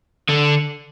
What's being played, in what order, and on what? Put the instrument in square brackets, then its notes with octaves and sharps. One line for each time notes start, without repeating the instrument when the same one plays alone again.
[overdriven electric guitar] D3